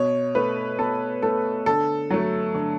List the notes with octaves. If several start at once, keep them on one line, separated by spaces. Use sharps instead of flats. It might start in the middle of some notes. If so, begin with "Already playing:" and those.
Already playing: B2 C#5
A3 B4
B2 A4
A3 A4
D3 A4
F#3 A3
D3